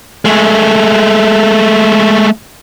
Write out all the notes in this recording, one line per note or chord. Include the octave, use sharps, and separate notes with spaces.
G#3 A3